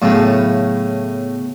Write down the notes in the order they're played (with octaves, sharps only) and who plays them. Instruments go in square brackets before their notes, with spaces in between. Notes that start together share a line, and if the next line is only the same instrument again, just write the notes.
[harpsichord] A2 C#3 [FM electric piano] F#3 A3 B3